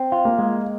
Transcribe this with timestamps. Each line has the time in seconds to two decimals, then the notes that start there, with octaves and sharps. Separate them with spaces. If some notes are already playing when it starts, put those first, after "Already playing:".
Already playing: C4
0.12 F4
0.25 A#3
0.38 G#3